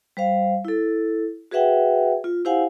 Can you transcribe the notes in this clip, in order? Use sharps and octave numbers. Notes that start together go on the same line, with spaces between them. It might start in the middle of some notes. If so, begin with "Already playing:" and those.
G3 C5 F5
E4 A4
F#4 G#4 B4 E5 F#5 G5
F4
E4 G4 C5 F5 F#5 G#5